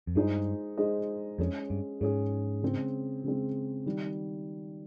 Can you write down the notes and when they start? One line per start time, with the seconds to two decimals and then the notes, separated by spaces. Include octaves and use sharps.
0.07 F2
0.15 G2 G#3 D#4 G#4 C5 D#5
0.77 G#3 D#4 G#4 C5 D#5
1.38 F2 G#3 C#4 G#4
1.70 G2
2.01 G#2 G#3 C#4 G#4
2.63 C#3 G#3 C4
3.24 C#3 G#3 C4
3.86 D#3 G3